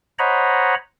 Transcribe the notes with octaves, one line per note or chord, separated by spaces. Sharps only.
C5 C#5 D#5 F#5 A#5 B5